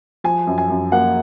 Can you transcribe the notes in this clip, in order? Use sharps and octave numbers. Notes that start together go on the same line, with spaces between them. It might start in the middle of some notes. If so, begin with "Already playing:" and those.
F3 G#5
F#2
G#5
F#2
A#3 F#5